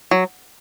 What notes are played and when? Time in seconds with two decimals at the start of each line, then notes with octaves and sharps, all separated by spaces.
0.11 F#3